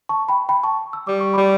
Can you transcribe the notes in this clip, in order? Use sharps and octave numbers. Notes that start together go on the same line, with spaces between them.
A5 C#6
G5 B5
G5 B5
A5 C#6
E6
G3 D6
C#6
G3 B5 D6